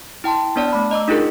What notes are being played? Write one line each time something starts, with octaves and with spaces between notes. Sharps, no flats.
E4 G5 A5 C6
B3 D4 C#5 D5 A5
A3 B5
D#5 A#5 D6 E6
D4 D#4 F4 G#4 A#4